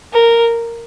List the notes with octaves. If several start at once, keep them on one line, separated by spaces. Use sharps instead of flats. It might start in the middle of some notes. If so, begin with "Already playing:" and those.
A#4